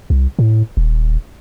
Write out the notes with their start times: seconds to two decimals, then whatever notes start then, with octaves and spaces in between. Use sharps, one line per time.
0.10 C2
0.39 A2
0.77 D#1